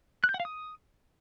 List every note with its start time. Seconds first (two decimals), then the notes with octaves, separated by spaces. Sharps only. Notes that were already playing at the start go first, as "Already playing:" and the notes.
0.24 F#6
0.29 G6
0.34 F#5
0.40 F5
0.45 D#6